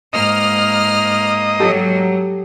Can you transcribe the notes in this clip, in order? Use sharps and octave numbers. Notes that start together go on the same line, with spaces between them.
G#2 A#3 D#5 F6
F#3 G4 A4